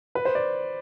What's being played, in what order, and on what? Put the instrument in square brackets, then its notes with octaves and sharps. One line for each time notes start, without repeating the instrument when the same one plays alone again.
[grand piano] B4
C5
D5